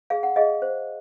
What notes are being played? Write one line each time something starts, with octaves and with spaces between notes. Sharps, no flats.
G#4 F5
F#5
G#4 D#5 F5
C5